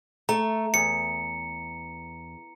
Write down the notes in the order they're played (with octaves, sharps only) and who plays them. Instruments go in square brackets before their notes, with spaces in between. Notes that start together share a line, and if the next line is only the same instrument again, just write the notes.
[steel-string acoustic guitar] A3 [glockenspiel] A#5
[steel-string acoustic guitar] E2 [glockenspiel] C#7